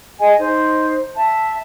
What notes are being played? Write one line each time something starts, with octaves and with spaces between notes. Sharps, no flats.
G#4 D#5 G#5
D#4 C5
E5 A5